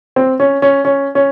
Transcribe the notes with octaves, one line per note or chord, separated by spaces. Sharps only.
C4
C#4
C#4
C#4
C#4